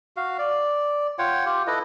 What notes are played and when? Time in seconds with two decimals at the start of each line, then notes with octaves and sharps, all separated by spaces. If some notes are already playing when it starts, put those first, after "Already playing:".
0.17 F#4 F5
0.39 D5
1.19 F4 C#5 F#5 G5
1.46 F4 G4
1.67 E4 A4 B4 D#5